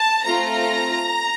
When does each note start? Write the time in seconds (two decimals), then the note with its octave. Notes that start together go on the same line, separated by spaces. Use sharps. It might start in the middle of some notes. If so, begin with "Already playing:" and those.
Already playing: A5
0.24 A3 C4 F4 A#5